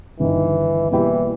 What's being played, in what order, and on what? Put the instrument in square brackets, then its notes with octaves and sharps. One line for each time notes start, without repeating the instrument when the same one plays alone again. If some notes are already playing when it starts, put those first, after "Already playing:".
[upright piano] G1 G2 D#3 [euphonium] E3
[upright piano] B2 G3 A#3 E4 G4 [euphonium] E3